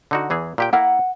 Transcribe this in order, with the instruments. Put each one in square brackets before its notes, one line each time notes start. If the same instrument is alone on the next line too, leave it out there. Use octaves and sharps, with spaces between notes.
[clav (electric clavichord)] D3 D#4 F#4
E2 E3 G#4
A#2 G4 G5
[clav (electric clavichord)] A#3 E4 A#4 [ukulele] F#5